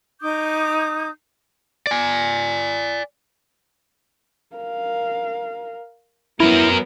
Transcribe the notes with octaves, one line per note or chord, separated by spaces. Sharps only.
D#4 D6 D#6 G6
D5 G#5
A#4 F5
F#3 B3 E4 A#4